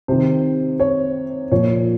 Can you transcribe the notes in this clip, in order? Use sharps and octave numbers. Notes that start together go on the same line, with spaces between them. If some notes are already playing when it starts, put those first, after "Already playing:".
C3 D#3 C5
C#5
A#2 F3 C#5